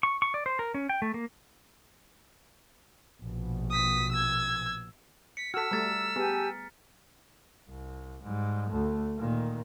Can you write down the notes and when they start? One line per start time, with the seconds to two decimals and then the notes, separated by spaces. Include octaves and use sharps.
0.03 C#6
0.22 C#6
0.34 D5
0.46 C5
0.59 A#4
0.74 C#4
0.89 G5
1.02 A3
1.14 A#3
3.21 A#1 B2
3.70 D#6 B6
4.12 E6 G#6
5.37 B6 C#7
5.54 F#4 A4 E6 F6 B6
5.71 G3 A3 A#5 A6 B6
6.16 B3 G4 G#4 G#5 A5
7.69 C2
8.25 G#2 G3
8.69 D2 A3
9.19 A#2 D#3